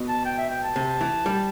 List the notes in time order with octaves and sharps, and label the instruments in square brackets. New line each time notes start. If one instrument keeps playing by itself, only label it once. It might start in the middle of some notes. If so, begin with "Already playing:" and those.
Already playing: [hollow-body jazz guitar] B2
[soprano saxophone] A5
G5
E5
G5
A5
[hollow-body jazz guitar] C3
E3
G3